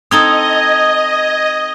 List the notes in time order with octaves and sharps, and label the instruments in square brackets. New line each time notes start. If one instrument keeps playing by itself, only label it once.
[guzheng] C4 D#4 A4 [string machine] D#5 [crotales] D#6 G#6 G7